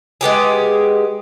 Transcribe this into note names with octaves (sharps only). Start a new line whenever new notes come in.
G#3 B3 G4 G#4